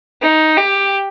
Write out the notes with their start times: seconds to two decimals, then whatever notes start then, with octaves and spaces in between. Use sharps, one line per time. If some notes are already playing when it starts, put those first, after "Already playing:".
0.22 D#4
0.57 G4